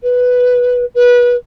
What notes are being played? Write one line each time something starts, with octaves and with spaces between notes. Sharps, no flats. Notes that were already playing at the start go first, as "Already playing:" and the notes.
B4
B4